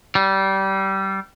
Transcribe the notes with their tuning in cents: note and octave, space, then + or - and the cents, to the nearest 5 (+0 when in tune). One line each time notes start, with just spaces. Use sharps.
G3 -20